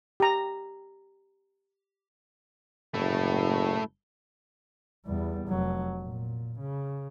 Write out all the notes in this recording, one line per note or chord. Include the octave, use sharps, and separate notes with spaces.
G4 A#5
F#1 A3 E4
E2 G3
F1 F#3
A#2
C#3